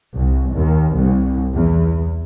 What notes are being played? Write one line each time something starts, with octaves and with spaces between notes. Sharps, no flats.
C2
D#2
C2
E2